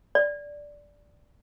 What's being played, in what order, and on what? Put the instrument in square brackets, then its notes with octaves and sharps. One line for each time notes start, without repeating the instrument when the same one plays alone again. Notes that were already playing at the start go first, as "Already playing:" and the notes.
[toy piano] D5